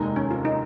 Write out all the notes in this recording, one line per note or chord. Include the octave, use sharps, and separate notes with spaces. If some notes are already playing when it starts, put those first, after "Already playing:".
Already playing: F1 D#2 D#3 G#3 D#4
C#4
F4
D#4